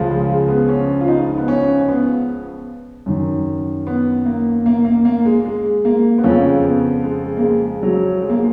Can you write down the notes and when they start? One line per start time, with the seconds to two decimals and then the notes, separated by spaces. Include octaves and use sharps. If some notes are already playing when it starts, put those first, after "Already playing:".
Already playing: C#2 C#3 F3
0.10 G#3
0.29 G#3
0.49 B3
0.68 C#4
1.01 F4
1.08 D#4
1.38 B3
1.48 C#4
1.81 C#4
1.88 B3
3.06 F#2 D#3
3.87 B3
4.26 A#3
4.66 A#3
4.85 A#3
5.05 A#3
5.25 G#3
5.45 G#3
5.85 A#3
6.18 B3
6.24 F2 C#3 F3 C#4
6.64 B3
7.04 G#3
7.37 A#3
7.42 G#3
7.83 F#3
8.22 G#3
8.29 A#3
8.37 G#3